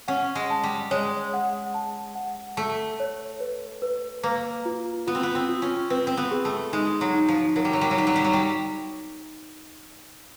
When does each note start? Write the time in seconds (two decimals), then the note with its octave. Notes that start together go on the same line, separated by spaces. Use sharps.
0.08 C#4 F#5
0.35 G#3
0.50 A5
0.64 G3
0.91 G#3 C#5
1.33 F#5
1.74 A5
2.15 F#5
2.57 A3 A5
3.00 C#5
3.40 B4
3.82 B4
4.23 A#3 B4
4.65 F4
5.07 B3 F4
5.15 C4
5.23 B3
5.35 C4
5.49 F4
5.62 C#4
5.90 C4 B4
6.07 C4
6.17 B3
6.31 G#4
6.45 A3
6.73 G#3 D#4
7.01 F#3
7.14 D#4
7.28 F3
7.56 F#3 A#4
7.65 G3
7.73 F#3
7.81 G3
7.91 F#3
7.98 G3 D#4
8.07 F#3
8.16 G3
8.24 F#3
8.33 G3